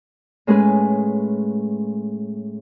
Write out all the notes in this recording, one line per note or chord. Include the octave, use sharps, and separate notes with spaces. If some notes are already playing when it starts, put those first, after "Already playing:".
A2 G#3 C#4 G#4 B4